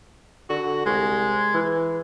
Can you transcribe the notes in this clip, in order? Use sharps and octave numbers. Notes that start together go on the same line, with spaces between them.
D3 F#4
C2 G#3
E3